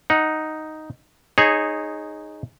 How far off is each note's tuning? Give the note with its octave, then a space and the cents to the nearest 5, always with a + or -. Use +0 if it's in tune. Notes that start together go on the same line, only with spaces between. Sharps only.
D#4 +0 F#5 +0
D#4 -10 G#4 +0 C#5 -25